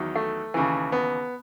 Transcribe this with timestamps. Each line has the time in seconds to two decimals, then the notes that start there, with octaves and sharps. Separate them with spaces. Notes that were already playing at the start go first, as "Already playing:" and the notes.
Already playing: E2 D#3 F#3
0.16 A3
0.54 D#2 C#3 E3
0.92 B3